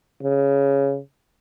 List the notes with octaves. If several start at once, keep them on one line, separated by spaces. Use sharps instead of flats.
C#3